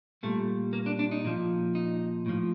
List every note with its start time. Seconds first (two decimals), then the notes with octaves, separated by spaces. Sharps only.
0.23 A#2 G3 A3
0.73 A#3
0.86 D4
0.99 D4
1.11 D#4
1.25 A#2 F3
1.75 D#4
2.26 A2 F3